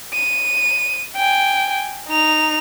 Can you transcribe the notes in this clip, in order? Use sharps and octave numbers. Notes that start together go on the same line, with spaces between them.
D#7
G5 G#5
D#4 F7